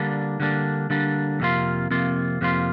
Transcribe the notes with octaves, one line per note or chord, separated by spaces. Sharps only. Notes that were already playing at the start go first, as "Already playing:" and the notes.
Already playing: D3 G3 A#3 D4
D3 G3 A#3 D4
D3 G3 A#3 D4
F2 C3 A#3 F4
F2 C3 A#3 F4
F2 C3 A#3 F4